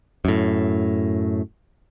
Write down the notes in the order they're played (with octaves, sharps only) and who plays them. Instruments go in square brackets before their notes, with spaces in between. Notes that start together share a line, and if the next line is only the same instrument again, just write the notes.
[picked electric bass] F#2 A2